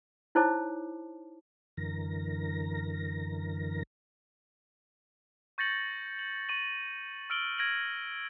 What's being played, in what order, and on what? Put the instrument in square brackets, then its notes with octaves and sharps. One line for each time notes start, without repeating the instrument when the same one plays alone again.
[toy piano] D#4 E4 C5 C#5 A5 D6
[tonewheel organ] F#2 D3 E3 A#4 A#6
[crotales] C#6 G6 A6 A#6 C#7 F#7
F#7
C#6 D#7 F#7
E6 F6 D7 F#7 G7
F6 G#6 A#6 D7 D#7 F#7